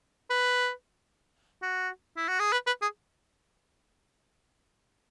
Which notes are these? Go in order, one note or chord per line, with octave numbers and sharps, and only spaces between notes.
B4
F#4
E4
F#4
G#4
B4
B4
G#4